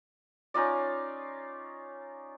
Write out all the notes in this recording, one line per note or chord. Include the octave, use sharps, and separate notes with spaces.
C#4 D#4 F4 D5